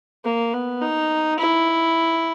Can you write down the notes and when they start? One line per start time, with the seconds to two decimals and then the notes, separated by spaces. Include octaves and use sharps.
0.24 A#3
0.53 B3
0.82 D#4
1.39 E4